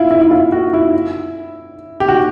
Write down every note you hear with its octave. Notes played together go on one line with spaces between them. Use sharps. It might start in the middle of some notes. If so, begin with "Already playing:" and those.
Already playing: E4 F4
E4
E4
F4
F#4
E4
G4
F#4